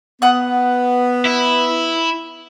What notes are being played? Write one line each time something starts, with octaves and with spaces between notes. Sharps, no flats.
B3 F#5 D#6
E4